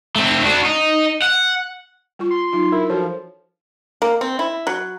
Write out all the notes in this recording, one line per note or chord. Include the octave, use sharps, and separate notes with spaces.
A3 C4
D4 F#4
D#4
F#5
G3 F4 C#6
C6
F#3 D#4 F4
D4 E4 A#4
F3 F#4 A4 C#5
A#3
C4
E4
F#3